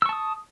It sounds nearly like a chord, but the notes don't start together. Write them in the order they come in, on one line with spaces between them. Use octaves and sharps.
E6 C#6 A5 D#6